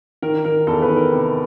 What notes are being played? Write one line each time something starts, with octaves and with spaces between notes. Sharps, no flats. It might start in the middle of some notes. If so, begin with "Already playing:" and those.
D#3 A#4
D#3 A#4
E2 A4
B4
D#3
A#4
C3